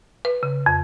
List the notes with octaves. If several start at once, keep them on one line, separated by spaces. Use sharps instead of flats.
B4
C#3
F2